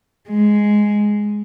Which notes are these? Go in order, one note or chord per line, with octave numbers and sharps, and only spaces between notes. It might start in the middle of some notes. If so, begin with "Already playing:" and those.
G#3